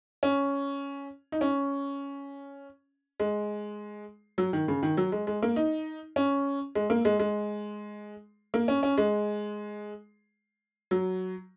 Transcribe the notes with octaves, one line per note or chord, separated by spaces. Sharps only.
C#4
D#4
C#4
G#3
F#3
D#3
C#3
D#3
F#3
G#3
G#3
A#3
D#4
C#4
G#3
A#3
G#3
G#3
A#3
C#4
C#4
G#3
F#3